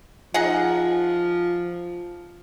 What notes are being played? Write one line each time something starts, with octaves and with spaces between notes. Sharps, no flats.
F3 D#4 G#4 F#5